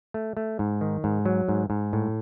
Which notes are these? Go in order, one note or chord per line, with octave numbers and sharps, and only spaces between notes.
A3
A3
G#2
D#3
G#2
F#3
G#2
G#2
A2